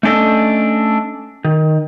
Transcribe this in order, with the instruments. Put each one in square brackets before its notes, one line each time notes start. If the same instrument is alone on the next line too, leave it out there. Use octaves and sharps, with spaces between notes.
[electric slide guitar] A3 C#4 D4 A4 D#5
D#3